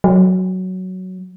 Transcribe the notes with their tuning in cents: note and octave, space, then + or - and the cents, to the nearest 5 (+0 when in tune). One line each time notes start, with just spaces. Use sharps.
F#3 +5